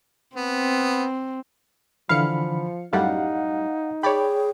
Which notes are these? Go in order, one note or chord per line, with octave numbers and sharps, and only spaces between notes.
B3 C4
D3 E3 F3 F5 B5 C#7
F#2 A2 G3 D#4 F5 F#5
G#4 C#5 D5 G5 B5